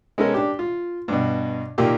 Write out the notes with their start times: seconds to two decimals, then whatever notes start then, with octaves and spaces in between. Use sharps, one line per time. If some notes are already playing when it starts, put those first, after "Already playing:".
0.18 G#3 B3 C#4 A4 A#4 C#5
0.34 D4 G4
0.59 F4
1.08 G2 B2
1.78 D#2 A#2 A#3 G4